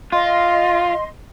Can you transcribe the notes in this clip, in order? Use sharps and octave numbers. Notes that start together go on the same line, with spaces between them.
F4 D#5 C6